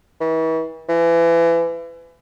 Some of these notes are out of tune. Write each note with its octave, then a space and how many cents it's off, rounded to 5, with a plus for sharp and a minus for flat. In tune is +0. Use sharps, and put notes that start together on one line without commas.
E3 -40
E3 +30